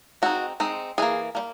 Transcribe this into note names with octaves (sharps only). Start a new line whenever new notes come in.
G#3 C4 D#4 F#4
G#3 C4 D#4
E3 G3 A#3 G#4
G3 A#3